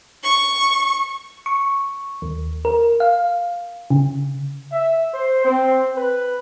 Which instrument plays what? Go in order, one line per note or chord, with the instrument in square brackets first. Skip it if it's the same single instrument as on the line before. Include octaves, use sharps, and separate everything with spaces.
[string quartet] C#6
[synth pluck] C#6
D#2
A#4
F5
C#3
[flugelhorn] E5
C5
C4
B4